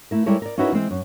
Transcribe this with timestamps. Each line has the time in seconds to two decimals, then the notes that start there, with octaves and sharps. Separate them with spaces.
0.11 A3 E4 A#4
0.26 G3 G#3 E4 A4 A#4 C#5
0.42 A#4 D5
0.58 C#4 D#4 E4 F#4 A#4 B4
0.72 E3 G#3 C4 C5
0.91 F#2